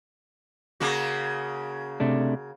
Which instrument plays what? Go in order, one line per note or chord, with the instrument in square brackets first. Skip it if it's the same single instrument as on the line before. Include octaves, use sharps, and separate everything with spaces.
[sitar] C#3 A#3 F#4
[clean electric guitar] C3 A3 D4